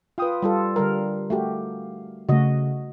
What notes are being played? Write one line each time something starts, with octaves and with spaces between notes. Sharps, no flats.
F4 B4 F5 G5 D#6
G3 F4 A4
D3 G3 A#4 F5
A3 F#4 G4
C#3 A3 F#4 D#5